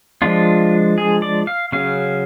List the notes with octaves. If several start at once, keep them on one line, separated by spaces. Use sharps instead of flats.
F3 G#3 D4 F4
G#4
D5
F5
C#3 F#3 C#4 F5